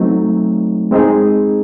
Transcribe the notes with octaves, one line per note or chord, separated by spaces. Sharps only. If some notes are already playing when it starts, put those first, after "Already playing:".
Already playing: F#3 A3 C4 D#4
G#3 C4 D#4 G#4